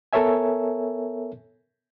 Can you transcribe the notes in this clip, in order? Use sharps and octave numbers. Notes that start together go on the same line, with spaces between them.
B3 A4 A#4 C#5 E5 G#5